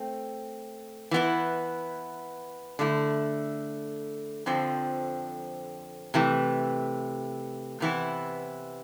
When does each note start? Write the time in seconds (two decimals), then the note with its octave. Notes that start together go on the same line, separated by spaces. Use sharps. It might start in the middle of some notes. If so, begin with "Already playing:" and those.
Already playing: A3 C4
1.11 E3 B3 E4
2.79 D3 A3 E4
4.46 F2 D3 F3 C4
6.14 C3 E3 A3
7.80 C3 E3 B3 E4